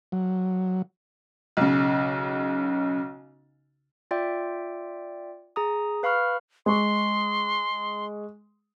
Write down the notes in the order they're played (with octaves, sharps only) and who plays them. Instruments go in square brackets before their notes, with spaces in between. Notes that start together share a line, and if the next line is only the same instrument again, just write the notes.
[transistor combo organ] F#3
[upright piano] B1 C#3
[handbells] F4 D5 E5 G5
G#4 A#5 D#6
B4 F5 B5 C#6 F6
[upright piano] G#3 C#6 [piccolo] C6